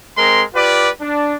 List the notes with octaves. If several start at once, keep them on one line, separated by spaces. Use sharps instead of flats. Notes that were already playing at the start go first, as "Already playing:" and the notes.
G#3 C4 A#4 C6
F4 G4 B4 D5
D4